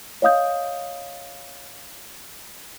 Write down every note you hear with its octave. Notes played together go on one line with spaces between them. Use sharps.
C#5 D#5 F5 D#6 G6